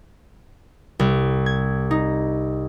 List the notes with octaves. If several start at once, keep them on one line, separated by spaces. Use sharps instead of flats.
C2
G#6
D#4